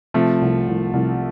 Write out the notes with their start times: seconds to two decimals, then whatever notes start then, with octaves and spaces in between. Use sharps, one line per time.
0.14 C3 F3 A3
0.42 C2
0.68 C2
0.93 C2